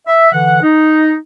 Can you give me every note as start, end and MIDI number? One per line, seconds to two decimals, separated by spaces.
0.06 0.28 76
0.32 0.63 50
0.32 0.63 52
0.32 0.63 78
0.63 1.14 63